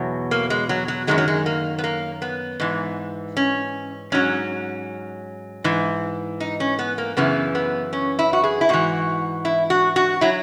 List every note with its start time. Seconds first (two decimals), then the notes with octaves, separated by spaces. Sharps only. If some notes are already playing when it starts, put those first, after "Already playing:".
Already playing: E2 B2 F#3
0.31 A#3
0.50 G#3
0.69 F#3
0.88 F#3
1.07 F#2 D#3 F#3 G#3
1.18 F#3
1.28 G#3
1.46 A#3
1.78 B3
1.84 A#3
2.22 B3
2.60 G#2 E3
3.37 C#4
4.12 G#2 F#3 C#4
5.64 G#2 E3
6.40 D#4
6.60 C#4
6.79 B3
6.98 A#3
7.17 F#2 C#3 E3 B3
7.55 B3
7.93 C#4
8.19 E4
8.33 F#4
8.44 G#4
8.61 E4
8.69 G#2 E3 F#4
9.45 E4
9.70 F#4
9.96 F#4
10.21 F#3 E4